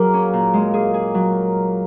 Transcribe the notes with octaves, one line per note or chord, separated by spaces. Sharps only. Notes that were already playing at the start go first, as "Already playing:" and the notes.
Already playing: F#3 A#3 G#4
C#4
A#2
G#3
G#4
G#4
F#3